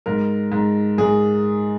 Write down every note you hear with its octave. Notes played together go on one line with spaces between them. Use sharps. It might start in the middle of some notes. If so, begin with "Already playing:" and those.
G#2 A#4
G#2
G#2 G#4